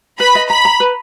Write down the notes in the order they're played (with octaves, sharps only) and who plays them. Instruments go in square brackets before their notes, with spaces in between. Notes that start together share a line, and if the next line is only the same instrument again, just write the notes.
[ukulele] B4 [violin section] B5
[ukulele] D#5
[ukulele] A#5 [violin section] B5
[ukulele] A#5
B4